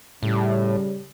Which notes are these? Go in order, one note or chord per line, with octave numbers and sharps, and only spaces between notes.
A2 C#3 G3